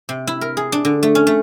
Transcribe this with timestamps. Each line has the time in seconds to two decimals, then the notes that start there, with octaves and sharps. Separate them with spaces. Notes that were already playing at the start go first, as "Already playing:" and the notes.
0.09 C3
0.27 E4
0.41 A#4
0.57 G#4
0.72 D4
0.85 D3
1.03 A3
1.15 C#4
1.27 A3